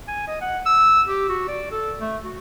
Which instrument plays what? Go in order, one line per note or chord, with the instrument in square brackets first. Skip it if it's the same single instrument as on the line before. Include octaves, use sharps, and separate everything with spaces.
[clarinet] G#5
D#5
F#5
E6
G4
F#4
D5
A4
A3
F#4